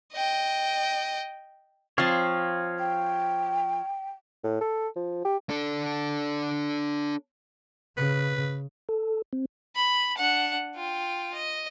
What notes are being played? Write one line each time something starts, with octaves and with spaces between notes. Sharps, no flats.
D#5 G5
F3 C4 C#5 F5
G5
A2
A4
F3
G4
D4 A4
C#3 B4
A4
C4
B5
D4 F#5
F4 G5
D#5